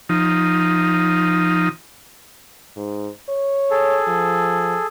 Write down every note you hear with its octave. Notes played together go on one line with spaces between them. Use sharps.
F3 D#4
G#2
C#5
G#4 A4
F3